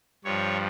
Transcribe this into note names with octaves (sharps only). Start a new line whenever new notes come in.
G2 F3 C#5